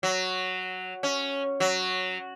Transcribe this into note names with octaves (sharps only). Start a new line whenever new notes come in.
F#3
C#4
F#3